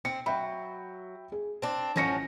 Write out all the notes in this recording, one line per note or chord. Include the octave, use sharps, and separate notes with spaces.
C4 C#7
F#3 E5 G5 B5
G#4
C4 D4
A1 F3 F#3 C#4 A#6 C#7